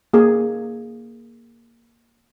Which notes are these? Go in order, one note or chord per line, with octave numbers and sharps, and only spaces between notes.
A#3 G#4